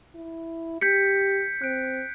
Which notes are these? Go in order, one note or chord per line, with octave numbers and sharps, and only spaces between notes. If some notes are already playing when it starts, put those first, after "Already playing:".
E4
G4 G6 B6 C#7
C4 F#6 D7